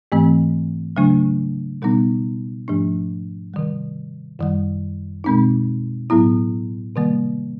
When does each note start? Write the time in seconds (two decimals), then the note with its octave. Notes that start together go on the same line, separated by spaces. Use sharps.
0.12 G#2 E3 A3 C4
0.96 C#3 F#3 A3 D4
1.82 B2 G3 B3 D#4
2.68 G#2 F3 A3 D4
3.54 C3 D#3 G3
4.39 F#2 D#3 G3
5.24 B2 G#3 C4 D#4
6.10 A2 F#3 B3 E4
6.96 C3 D#3 G3 A#3